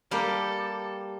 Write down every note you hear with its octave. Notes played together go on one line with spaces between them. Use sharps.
G3 A#3 G4 A4